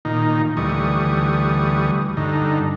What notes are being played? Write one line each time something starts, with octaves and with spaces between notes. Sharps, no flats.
A#2 D#3 D#4
D2 E3 G3 C#6 D#6
G2 D3 D#4